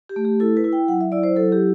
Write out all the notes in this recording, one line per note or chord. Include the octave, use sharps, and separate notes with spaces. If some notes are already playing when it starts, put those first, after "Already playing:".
G4
A3
G4
E4 A4
B4
E4
G5
F#3 F#5
E5
E4 D5
C5
F#3 A4
G4